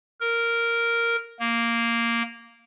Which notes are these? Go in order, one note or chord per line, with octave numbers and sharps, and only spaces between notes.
A#4
A#3